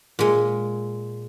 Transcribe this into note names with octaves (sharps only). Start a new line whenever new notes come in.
A#2 G#3